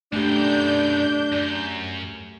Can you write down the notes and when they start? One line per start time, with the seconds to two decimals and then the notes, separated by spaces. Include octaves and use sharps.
0.13 F#2 B2 A3 D4 G4 G6
1.32 F#2